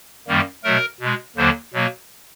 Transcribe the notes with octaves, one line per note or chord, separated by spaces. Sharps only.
F#2 D#3 G3 A#3
B2 F#3 A3 A#4
B2 G#3
D#2 D3 F#3 A#3 C5
B2 F#3 A#3